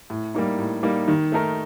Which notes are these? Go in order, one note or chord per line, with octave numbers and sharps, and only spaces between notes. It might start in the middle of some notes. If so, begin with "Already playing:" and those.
A2
G3 A#3 D#4
A2
G3 A#3 D#4
D#3
A3 D#4 A#4